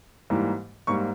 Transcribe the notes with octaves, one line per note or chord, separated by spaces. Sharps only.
G#2 E3 G3 A#3
G#2 G3 A#3 C#6